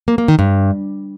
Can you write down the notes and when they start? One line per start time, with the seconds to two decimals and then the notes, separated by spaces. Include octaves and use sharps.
0.08 A#3
0.18 A#3
0.28 D#3
0.39 G2